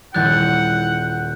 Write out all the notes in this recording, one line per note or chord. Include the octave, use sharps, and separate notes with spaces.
D#1 G3 E4 F#5 F#6 G6 A6